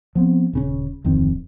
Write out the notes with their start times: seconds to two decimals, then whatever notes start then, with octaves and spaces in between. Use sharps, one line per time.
0.15 F3 B3 C4
0.53 D#1 C#3 C#4
1.04 D1 F2 D#3 C4